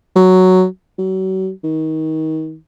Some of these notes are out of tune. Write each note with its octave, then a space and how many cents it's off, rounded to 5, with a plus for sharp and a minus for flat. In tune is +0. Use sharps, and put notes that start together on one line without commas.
F#3 +0
F#3 +35
D#3 +25